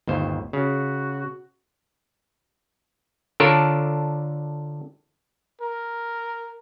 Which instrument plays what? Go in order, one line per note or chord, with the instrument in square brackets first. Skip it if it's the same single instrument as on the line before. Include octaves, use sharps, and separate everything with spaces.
[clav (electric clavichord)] G1 D#2 C5
[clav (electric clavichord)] C#3 [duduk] F#4
[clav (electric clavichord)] D3 D4 F4 A4 A#4 C#5
[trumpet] A#4